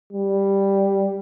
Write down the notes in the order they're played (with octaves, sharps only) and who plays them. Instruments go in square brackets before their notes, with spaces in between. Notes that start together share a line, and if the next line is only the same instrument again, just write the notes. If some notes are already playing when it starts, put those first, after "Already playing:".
[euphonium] G3